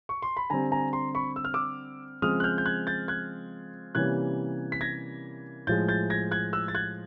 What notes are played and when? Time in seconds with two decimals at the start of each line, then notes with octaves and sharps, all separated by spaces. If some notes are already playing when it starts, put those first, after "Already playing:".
0.09 C#6
0.22 C6
0.37 B5
0.50 D3 G3 C4 G#5 A#5
0.72 G#5 A#5
0.93 A#5 C6
1.15 B5 C#6
1.36 E6
1.45 F6
1.54 D6 E6
2.22 C#3 F3 G#3 C4 D#6 F6
2.40 F#6
2.44 F6 G6
2.58 G6
2.66 F#6 G#6
2.87 G6 A6
3.08 F#6 G#6
3.95 C3 E3 G3 A#3 C#4 F#6 G#6
4.72 B6
4.81 G#6 A#6
5.67 A2 F3 G#3 G6 A6
5.88 G6 A6
6.10 G#6 A#6
6.31 F#6 G#6
6.53 E6 F#6
6.68 A6
6.75 F#6 G#6